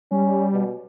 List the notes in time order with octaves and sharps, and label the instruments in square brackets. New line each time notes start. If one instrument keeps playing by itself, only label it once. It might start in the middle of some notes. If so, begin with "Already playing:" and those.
[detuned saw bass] G3 [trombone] C#4
[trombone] B2